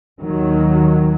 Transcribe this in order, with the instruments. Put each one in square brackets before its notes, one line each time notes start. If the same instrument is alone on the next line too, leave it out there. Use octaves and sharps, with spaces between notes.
[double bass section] D#2 D#3 F#3